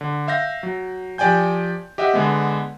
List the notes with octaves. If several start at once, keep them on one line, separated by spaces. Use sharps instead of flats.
D3
E5 F5 G6 A#6
F#3
F3 G4 D5 G5 G#5 G6
G4 D#5 E5 F#5
D3 G#3 B3